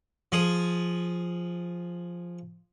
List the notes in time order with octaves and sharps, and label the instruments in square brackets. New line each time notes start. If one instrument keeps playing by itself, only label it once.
[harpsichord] F3 G#4